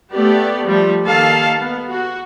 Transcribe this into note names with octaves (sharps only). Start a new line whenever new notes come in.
A3 B3 G4 D5
F3 G3 A3
D#3 A#3 A4 F5 A5
B3
F#4